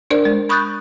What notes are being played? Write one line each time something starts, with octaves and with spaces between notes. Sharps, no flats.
D4 A#4 C5 D5
G#3
B5 C#6 D#6 F#6 G6 A6